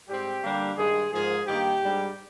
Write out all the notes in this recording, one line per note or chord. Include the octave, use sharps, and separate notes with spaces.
G#2 G3 C4 G4
D3 G3 A#3 D4
G2 D#3 G#3 G#4
G#2 F3 A#3 G#4
G2 D#3 A#3 G4
G#2 G3 D4